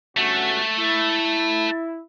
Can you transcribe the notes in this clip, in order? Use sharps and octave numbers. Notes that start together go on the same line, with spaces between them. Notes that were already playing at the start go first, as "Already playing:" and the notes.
G1 A3 C#4 F#4
E4